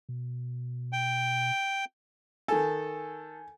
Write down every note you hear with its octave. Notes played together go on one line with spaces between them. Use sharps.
B2
G5
D#3 A4 G#5